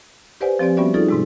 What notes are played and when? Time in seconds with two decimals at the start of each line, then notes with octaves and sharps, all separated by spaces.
0.41 G4 B4 C5 D5 F#5 G#5
0.59 F3 C4 G4 D5 G#5
0.77 G3 B3 C#4 F#4 D5 E5
0.94 D#4 F4 G#4 A4 D5
1.08 G#2 C3 G#3